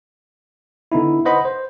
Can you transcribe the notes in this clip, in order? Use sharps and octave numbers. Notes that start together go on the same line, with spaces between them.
D3 B3 D#4 E4
B4 C5 D#5 F#5 B5
C5